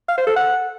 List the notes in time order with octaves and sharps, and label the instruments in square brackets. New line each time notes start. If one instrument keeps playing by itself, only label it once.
[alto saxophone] F5
C5
A4
F#5